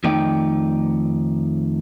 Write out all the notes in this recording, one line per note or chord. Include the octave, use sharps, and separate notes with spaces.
F2 D#3 A3 D#4 D5 G5